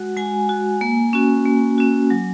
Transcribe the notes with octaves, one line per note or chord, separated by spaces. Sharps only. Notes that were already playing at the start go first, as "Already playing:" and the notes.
Already playing: G#3 F#4 F#5
G#3 G#5
F#4
A#3
C#4 F#4
A#3
C#4 F#4
F#3